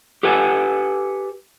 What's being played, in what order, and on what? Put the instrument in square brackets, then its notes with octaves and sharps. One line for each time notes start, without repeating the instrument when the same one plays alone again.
[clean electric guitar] G4 A4 B4 F#5 G#5